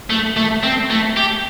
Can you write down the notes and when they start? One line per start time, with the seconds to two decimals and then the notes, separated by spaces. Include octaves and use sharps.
0.10 A3
0.37 A3
0.63 C4
0.90 A3
1.17 G4